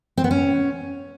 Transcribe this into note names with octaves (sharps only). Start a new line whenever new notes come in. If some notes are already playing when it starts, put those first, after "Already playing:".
C4
B3
C#4